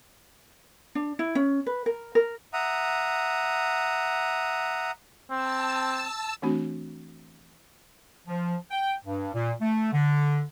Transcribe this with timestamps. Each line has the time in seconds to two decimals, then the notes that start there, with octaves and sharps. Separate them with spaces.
0.95 D4
1.19 E4
1.35 C#4
1.66 B4
1.86 A#4
2.15 A#4
2.53 E5 F#5 A#5 D#6
5.30 C4 A5 E6
6.42 E3 A3 C4 D4 F#4
8.27 F3
8.71 G5
9.04 G2
9.34 A#2
9.61 A3
9.92 D3